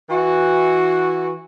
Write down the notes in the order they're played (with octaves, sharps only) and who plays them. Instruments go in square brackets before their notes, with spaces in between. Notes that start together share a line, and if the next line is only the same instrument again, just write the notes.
[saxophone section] E3 F#4